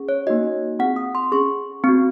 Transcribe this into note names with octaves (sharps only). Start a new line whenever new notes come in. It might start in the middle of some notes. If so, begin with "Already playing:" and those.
Already playing: C#4 G#4
C#5
A#3 D#4 F#4 D#5
C4 F4 G#4 F#5
D#6
C6
C#4 G#4 C#6
C4 F#4